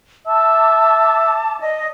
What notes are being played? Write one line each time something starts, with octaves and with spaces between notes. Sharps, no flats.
E5 A5 D6
D5 D#5